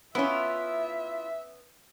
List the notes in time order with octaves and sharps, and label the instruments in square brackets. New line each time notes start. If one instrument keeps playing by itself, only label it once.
[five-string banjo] B3 C#4 [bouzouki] E4 F4 [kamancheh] E5